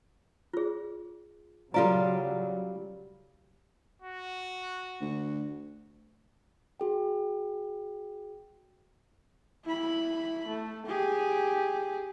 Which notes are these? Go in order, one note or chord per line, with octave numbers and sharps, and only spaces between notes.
F4 G#4
C#3 F#3 G3 F4 A4 D5 F5 A#5
F#4
D2
F#4 G#4 G5
E4 B5
A3
G4 G#4